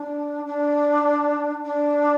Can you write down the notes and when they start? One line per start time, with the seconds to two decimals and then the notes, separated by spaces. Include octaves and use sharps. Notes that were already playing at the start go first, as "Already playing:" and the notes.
Already playing: D4
0.46 D4
1.65 D4